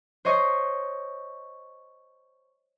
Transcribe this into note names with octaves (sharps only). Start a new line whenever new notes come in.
C5 C#5 D#5 C#6